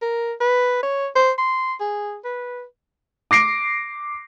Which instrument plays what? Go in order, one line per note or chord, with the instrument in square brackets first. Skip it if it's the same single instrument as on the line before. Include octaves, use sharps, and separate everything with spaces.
[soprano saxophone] A#4
B4
C#5
C5
C6
G#4
B4
[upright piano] D6 A#6 C7 D7